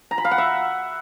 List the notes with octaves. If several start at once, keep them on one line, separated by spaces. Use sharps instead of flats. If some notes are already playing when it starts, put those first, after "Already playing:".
A#5
B5
F5
F#5
E5